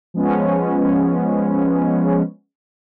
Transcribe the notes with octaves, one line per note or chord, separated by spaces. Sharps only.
F3 G#3 B3 C#4